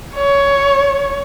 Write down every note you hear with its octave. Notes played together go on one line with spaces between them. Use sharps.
C#5